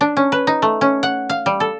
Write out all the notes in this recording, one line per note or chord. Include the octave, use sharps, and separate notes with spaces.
D4
C#4
B4
D#4
A3
C#4
F#5
F5
G3
A4